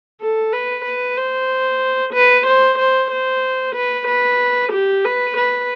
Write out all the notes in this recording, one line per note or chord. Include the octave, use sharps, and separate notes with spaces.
A4
B4
B4
C5
B4
C5
C5
C5
B4
B4
G4
B4
B4